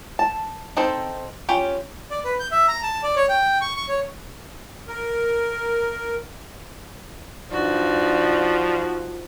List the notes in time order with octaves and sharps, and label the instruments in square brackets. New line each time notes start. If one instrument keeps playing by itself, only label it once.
[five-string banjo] A5
C4 D#4 A4 C5
C#4 F4 G4 G5
[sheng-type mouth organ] D5
B4
G6
E5
A#5
A5
D5
C#5
G5
C#6
C#6
C#5
[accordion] A#4
[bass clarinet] G2 [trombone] F3 [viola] D#4 F#4 [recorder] D5